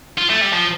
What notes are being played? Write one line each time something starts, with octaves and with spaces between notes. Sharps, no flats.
F4
A3
G3
F3